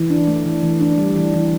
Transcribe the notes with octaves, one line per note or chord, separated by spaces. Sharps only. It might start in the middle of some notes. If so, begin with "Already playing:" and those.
Already playing: E3
D4
A3
E3
E3
D4
G3
E3
E3